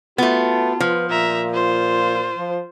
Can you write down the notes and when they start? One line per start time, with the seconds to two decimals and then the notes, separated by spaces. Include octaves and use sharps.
0.18 A3 B3 F4 F#4
0.80 F3 B4
1.10 A#2 E5 A#5
1.54 F4 C5
2.37 F3